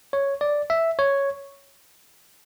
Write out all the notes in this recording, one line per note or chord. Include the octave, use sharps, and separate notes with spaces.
C#5
D5
E5
C#5